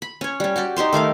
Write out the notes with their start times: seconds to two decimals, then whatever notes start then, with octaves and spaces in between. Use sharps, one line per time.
0.02 B5
0.21 C#4 C#5
0.40 G3 C#4
0.56 F#4 G4 D5
0.76 D#4 G4 C5 C6
0.93 D#3 A3 F5 D6